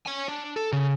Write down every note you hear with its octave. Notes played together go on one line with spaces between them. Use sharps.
C#5 G#5
D4
A4
C#3